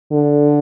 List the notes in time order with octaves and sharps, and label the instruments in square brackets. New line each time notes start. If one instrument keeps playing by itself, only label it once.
[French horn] D3